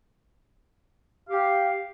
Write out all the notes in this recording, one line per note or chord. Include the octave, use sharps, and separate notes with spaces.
G4 F5